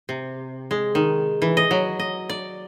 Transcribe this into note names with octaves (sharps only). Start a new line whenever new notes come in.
C3
G#3
D#3
E3
D#5
F#3
D#5
D5